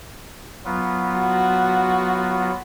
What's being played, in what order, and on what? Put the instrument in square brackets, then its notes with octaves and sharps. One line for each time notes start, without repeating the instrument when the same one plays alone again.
[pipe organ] F#3 B3 F4
[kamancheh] F#4